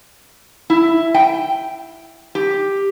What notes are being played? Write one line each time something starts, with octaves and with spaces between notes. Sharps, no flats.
E4
G5
G4